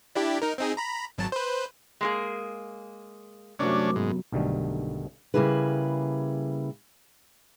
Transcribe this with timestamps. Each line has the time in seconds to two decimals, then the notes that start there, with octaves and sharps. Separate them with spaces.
0.15 D4 E4 G4
0.42 D#4 A#4
0.58 C4 D#4 G#4
0.77 A#5 B5
1.18 G#1 F#3 A5
1.32 B4 C5
2.01 G#3 A#3 G#4
3.59 C2 F#2 F#3 A3 C#4 D4 C5 D6
3.96 G#2 B3
4.32 B1 G2 D3 D#3 A3
5.34 C#3 G3 A#3 E4 G#4 B4